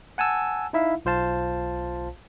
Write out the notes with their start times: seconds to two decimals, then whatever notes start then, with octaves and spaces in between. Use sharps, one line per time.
0.18 F#5 G#5 A5 E6
0.73 D#4 E4 E5 F5
1.05 B1 F4 C5 F5 A5